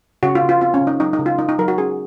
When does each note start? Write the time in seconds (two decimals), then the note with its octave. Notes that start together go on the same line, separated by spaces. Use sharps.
0.23 C#3 F#4
0.35 F4
0.42 C#3
0.49 F4
0.61 C4 F4
0.74 C#4
0.81 C#3
0.87 D#4
1.00 F#3 D#4
1.13 D#4
1.19 C#3
1.26 F4
1.39 C#3 D#4
1.49 D#4
1.59 F#3 A#4
1.68 F#4
1.78 C#4 G#4